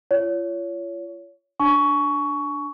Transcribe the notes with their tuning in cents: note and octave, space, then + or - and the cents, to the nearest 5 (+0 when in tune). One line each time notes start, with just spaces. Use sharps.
F4 -35 C#5 +25
D4 +0 G#5 +35 C#6 +15